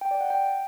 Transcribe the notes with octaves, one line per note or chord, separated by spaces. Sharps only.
G5
D5
F#5
G5